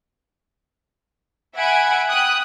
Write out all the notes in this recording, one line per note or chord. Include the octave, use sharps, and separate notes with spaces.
E5 F#5 G#5 B5 G#6 D7
G5 D#6 F#6